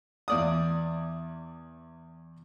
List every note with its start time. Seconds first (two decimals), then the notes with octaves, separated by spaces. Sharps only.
0.28 E2 D5 D#6